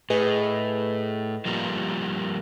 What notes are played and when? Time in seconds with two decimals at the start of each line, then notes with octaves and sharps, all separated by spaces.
0.10 A2 G#4 B4 D#5
1.45 F3 G3 A#3